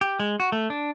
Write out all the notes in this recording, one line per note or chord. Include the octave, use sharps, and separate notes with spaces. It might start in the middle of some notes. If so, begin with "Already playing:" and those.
G4
G#3
F#4
A3
D4